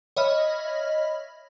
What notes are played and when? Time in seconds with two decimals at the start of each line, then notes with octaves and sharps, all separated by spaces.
0.16 C#5 D#5 E5 B5 F6